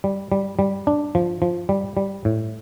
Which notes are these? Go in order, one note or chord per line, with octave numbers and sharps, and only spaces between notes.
G3
G3
G3
D4
F3
F3
G3
G3
A2